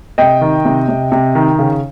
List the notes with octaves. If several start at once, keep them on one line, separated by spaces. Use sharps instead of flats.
C3 D#5 G5
D#3
C3
C3
C3
D#3
C#3